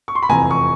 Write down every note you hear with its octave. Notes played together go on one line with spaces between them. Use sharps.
C#6
C6
B5
F1 E2 C3 G#5 A#5
C#6